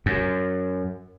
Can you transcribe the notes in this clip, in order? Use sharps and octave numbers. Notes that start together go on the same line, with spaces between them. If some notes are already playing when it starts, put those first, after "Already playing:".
F#2